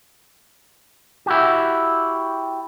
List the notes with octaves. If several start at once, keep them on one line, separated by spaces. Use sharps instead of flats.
E4 F#4 G4